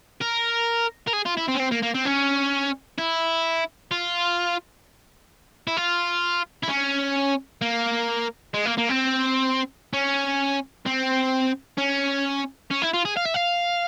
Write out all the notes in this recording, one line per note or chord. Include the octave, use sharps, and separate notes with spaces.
A#4
A#4
G#4
F4
E4
C4
C#4
C4
A#3
A#3
C4
C#4
E4
F4
E4
F4
E4
C#4
A#3
G#3
A#3
A#3
C4
C#4
C4
C#4
C#4
E4
F4
G#4
F5
E5
F5